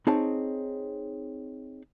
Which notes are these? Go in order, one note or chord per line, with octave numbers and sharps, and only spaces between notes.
C4 D#4 G#4 C#5 A5